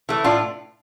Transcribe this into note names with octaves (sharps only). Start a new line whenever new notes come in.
E3 A3
A2 D4 F4